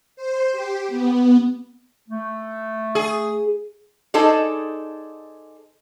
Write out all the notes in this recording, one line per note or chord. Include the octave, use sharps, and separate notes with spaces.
C5
G4
B3
A3
G#4
D#4 G#4 A4 C5 D5